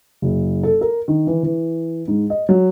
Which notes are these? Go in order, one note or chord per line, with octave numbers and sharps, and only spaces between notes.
F#1
A4
A#4
D#3
E3
E3
G#2
D#5
F#3